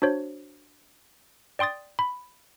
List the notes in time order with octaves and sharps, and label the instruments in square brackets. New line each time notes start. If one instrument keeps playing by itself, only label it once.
[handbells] D4 F#4 C5 C#5
D5 G5 C6 D#6 A6
B5